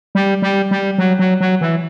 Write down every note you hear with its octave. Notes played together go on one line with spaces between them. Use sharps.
G3
G3
G3
F#3
F#3
F#3
E3